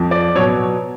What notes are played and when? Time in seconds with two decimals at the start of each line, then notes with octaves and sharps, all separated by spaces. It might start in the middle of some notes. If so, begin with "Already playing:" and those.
Already playing: F2 F3
0.11 D5
0.35 B2 F#3 C#5